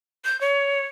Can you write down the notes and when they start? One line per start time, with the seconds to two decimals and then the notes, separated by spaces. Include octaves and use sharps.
0.25 G6
0.41 C#5